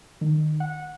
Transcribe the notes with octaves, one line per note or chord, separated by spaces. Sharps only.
D#3
F#5